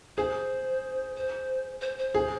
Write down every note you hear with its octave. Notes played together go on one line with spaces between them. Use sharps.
G#4 C5
C5
C5
C5
G#4